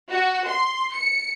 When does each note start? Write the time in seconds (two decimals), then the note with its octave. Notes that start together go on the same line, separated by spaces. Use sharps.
0.10 F#4
0.47 C6
0.94 C#7